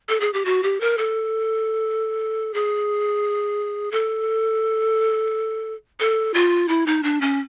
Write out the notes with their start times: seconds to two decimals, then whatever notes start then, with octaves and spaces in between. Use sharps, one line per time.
0.09 A4
0.20 G#4
0.33 G4
0.45 F#4
0.63 G4
0.81 A#4
0.98 A4
2.54 G#4
3.92 A4
6.00 A4
6.34 F4
6.68 E4
6.86 D#4
7.03 D4
7.21 C#4